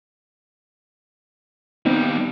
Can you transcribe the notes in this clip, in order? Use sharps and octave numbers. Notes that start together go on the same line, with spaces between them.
D#2 G3 B3 C4 D#4